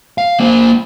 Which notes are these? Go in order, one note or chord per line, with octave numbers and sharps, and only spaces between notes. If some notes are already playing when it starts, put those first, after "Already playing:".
F5
A#3 C5